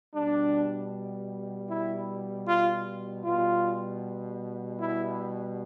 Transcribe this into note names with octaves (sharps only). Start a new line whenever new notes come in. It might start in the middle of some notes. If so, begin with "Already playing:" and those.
B2 G3 D4
E4
F4
B2 G3 F4
E4